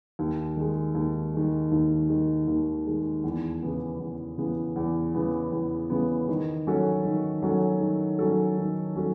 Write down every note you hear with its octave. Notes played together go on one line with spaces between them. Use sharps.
D#2
D#3 G#3
D#2
D#3 G#3
D#2
D#3 G#3
D#2
D#3 G#3
E2
C#3 E3 B3
E2
C#3 E3 B3
E2
C#3 E3 B3
E2
C#3 E3 B3
D#3
F#3 C#4 F#4 A4
D#3
F#3 C#4 F#4 A4
D#3
F#3 C#4 F#4 A4
D#3
F#3 C#4 F#4 A4